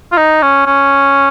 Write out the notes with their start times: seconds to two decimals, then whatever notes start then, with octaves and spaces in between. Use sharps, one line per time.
0.12 F4
0.17 D#4
0.42 C#4
0.66 C#4